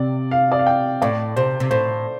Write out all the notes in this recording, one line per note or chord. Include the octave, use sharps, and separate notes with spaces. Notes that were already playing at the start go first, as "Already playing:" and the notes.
Already playing: C3 D5
F5
D5
F5
G5
A2 D5
C3 C5
C3
A2 C5